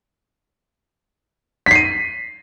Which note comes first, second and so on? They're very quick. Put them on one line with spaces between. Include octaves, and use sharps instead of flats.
B6 C7 D#7